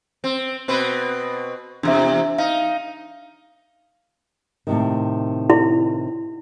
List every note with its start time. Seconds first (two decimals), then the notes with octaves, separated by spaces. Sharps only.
0.24 C4
0.68 B2 C4 B4
1.83 E2 C3 D4 E5
2.38 D#4 F5
4.67 A2 C3 D#3
5.50 E4